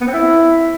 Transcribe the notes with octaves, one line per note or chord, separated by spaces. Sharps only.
B3
C4
E4